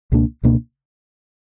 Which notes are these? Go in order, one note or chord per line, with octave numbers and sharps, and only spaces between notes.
C#2 B2 A#3 D4
C#2 B2 A#3 D4